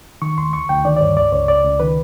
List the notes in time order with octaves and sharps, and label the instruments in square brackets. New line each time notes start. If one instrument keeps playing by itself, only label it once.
[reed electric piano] D#3 C#6
D#2 C6
D2 C#6
D2 G5
D#3 D5
D5
G2 C#5
C#2 D5
C#2 C#5
C#2 D5
C#2
D#3 B4